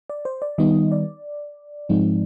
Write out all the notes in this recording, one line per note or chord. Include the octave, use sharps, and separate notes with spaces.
D5
C5
D5
D#3 G3 B3 D#4 D#5
D5
G#2 F3 G#3 C4 D#4